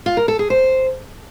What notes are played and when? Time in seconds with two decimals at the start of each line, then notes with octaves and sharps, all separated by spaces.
0.06 F4
0.17 A#4
0.28 A4
0.39 G#4
0.50 C5